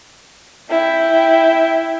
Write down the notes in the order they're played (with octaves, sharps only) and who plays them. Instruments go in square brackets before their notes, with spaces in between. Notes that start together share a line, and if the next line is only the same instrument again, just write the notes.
[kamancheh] E4 G5